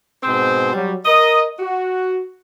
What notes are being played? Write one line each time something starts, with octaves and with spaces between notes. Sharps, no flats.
G#2 B2 C4 G#4 C5
F#3 G3
A#4 D#5
F#4